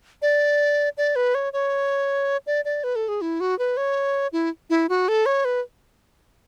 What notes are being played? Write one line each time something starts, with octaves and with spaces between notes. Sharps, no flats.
D5
D5
B4
C#5
C#5
D5
D5
B4
A4
G#4
E4
F#4
B4
C#5
E4
E4
F#4
A4
C#5
B4